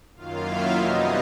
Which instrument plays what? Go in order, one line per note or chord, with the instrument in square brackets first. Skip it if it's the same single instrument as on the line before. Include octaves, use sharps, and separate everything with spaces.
[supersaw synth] F#2 D#3 F#3 A#3 F4 F5
E4 E5
C3 E3 G3 B3 D#4 D#5